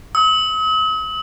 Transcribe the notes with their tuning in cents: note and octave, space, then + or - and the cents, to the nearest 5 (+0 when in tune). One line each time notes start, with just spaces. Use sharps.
D#6 +45